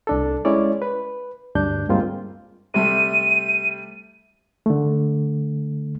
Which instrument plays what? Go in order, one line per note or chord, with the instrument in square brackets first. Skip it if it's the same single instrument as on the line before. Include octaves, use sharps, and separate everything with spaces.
[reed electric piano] C2 D4 A4
G#3 C#4 E4 C#5 D5
B4
D2 G2 D4 G6
G2 G3 G#3 A#3 C4 F4
[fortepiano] C3 G3 A3 [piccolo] D#7
[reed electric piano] D3 A3